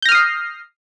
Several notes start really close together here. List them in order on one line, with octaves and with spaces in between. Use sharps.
G6 A#6 F6 D#6 C7